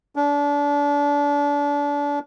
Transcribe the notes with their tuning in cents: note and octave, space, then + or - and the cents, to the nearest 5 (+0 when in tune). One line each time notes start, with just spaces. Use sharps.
D4 -30